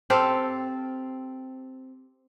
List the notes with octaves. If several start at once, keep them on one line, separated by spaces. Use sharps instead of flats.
C4 G4 A4 F5